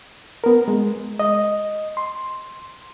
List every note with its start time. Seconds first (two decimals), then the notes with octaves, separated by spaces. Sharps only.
0.44 B3 A#4
0.68 G#3
1.19 D#5
1.97 C6